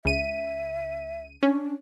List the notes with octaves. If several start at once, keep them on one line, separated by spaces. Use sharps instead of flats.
C#2 E5 D#7
C#4 D4